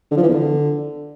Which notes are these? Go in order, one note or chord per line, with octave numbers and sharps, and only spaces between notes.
D3
F3
E3
E2
D3